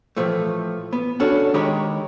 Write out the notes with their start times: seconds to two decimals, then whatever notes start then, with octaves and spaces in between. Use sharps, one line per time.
0.17 A2 E3 F3 A3
0.93 B3
1.20 C#4 D4 F#4 A4
1.54 D#3 G#3 G4 A#4 C#5 B5